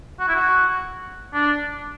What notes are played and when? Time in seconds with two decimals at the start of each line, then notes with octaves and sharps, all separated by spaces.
0.20 F#4
0.28 E4
0.36 F#4
1.34 D4